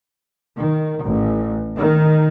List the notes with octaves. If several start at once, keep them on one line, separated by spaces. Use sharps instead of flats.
D#3
A1
D#3